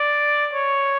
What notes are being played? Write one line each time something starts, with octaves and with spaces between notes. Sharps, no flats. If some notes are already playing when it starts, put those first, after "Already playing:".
Already playing: D5
C#5